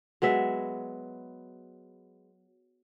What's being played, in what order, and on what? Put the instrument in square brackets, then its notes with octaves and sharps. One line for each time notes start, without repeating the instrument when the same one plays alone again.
[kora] F#3 G#3 B3 E5